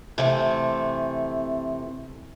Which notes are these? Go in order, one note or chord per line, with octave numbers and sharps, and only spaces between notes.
C3 E3 A3